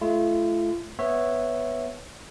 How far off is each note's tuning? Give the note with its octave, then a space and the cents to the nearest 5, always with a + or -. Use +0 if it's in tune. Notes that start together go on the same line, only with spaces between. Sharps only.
A3 -30 F4 -40
B3 +0 C#5 -10 E5 +0